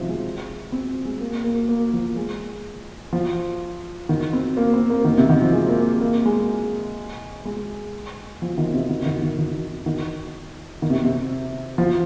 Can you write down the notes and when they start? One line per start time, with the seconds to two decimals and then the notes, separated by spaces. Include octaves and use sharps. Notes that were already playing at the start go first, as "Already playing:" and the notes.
Already playing: C3 D#3 F3
0.08 G#3
0.72 C4
1.05 G#3
1.21 A#3
1.44 A#3
1.69 A#3
1.93 F3
2.16 G#3
3.13 F3
4.09 D#3
4.33 C4
4.57 A#3
4.73 C4
4.90 A#3
5.05 D#3
5.18 C3
5.29 D#3
5.42 F3
5.53 G#3
5.69 A#3
6.01 A#3
6.25 G#3
7.45 G#3
8.42 F3
8.58 D#3
8.74 C3
8.89 D#3
9.06 D#3
9.22 D#3
9.38 D#3
9.86 D#3
10.82 D#3
10.90 C3
11.04 C3
11.78 F3